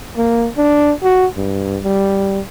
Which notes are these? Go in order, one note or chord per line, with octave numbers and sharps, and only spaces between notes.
A#3
D4
F#4
G2
G3